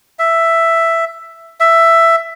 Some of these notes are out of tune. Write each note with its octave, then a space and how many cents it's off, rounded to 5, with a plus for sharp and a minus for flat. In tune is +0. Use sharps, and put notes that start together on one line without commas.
E5 +5
E5 +10